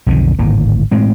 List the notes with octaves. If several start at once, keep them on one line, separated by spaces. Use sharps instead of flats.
B1 F2 D3 D#3
D1 G#1 A2 A#3
A2 G#3 C4